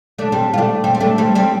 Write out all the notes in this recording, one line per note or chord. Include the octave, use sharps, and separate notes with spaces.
A3 D4
G3 C4
F4
A3 D4
G3 C4
C4
A3 D4
G3 C4
G3 C4